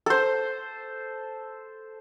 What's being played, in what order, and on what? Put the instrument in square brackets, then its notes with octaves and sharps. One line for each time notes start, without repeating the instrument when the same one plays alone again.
[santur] A4 C5